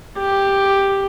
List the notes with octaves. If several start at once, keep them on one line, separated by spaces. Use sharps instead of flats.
G4